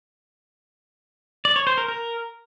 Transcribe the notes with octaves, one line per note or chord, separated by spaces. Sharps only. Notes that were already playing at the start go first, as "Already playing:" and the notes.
D5
C#5
C5
A#4
A#4